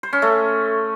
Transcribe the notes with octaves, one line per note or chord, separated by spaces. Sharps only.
C5
C#4
A3